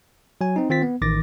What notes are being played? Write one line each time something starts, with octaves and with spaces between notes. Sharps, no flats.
F#3 G#5
C4 D#4
D#3 C4 F4 A6 B6
B3
A1 D#3 D6 A6 A#6